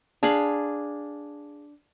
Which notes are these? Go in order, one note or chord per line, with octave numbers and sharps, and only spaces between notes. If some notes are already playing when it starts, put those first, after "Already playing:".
D4 G#4 F5 B5